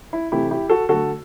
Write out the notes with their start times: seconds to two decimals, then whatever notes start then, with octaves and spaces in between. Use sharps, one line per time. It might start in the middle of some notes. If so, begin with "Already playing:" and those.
0.13 E4
0.32 C3 E3 A3 E4 G4
0.51 E4 G4
0.70 F#4 A4
0.89 D3 A3 F#4 A4